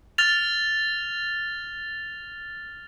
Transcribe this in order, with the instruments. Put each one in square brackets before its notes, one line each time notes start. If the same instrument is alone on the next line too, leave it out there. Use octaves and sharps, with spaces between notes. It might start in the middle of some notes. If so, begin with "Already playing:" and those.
[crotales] F6 A6 F7